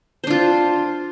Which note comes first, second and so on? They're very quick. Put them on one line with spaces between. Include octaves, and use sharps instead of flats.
C5 D4 F4